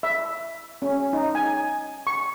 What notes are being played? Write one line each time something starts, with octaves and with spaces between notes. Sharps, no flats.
E5
C#4
D#4
G#5
C#6